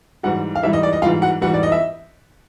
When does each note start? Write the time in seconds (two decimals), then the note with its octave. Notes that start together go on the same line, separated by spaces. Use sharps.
0.23 G#2 E3 G3 F#4 F#5
0.55 F5
0.63 G#2 E3 G3 E4 E5
0.73 D#5
0.83 D5
0.93 D#5
1.02 G#2 E3 G3 F4 F5
1.22 F#4 F#5
1.41 G#2 E3 G3 F#4 F#5
1.54 D5
1.63 D#5
1.72 E5